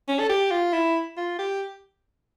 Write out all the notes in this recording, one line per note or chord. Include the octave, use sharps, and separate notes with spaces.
C#4
A4
G4
F4
E4
F4
G4